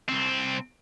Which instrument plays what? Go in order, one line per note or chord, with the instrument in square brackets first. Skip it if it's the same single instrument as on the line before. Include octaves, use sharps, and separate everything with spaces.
[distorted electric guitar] C2 C4